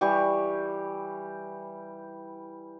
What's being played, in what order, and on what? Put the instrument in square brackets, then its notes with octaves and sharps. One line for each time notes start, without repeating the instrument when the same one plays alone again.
[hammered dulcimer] E3 G3 G4 C#6